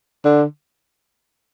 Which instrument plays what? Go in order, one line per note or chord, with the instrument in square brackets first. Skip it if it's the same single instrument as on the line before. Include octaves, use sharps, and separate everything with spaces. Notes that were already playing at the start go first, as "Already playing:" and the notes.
[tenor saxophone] D3